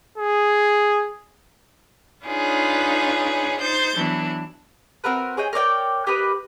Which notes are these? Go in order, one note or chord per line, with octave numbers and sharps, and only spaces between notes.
G#4
D4 D#4 F4 G#4 B4 C#5
D#4 C5 G6 A6
E3 F#3 B3 D4
C4 F#4 A#4 B4
G#4 C#5 D#5 G5
A#4 C#5 D5 G5
G4 A#4 B4 D#5